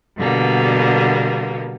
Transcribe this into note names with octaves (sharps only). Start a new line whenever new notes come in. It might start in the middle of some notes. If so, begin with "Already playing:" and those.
B2 D3 G3 A#3 B3